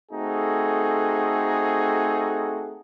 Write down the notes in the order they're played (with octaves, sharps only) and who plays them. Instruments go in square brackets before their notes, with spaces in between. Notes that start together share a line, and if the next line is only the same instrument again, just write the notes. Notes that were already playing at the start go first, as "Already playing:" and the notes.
[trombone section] A3 C4 D#4 F#4 G#4 A4